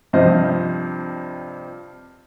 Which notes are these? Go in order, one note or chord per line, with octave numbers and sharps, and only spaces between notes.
G2 C3 F3 C5 D#5